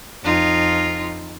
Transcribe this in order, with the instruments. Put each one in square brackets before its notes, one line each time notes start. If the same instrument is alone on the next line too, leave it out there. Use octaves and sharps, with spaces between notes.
[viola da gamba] F2 D#4 F4